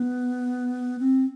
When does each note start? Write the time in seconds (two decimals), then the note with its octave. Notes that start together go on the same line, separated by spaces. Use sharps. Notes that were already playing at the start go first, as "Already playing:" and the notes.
Already playing: B3
0.99 C4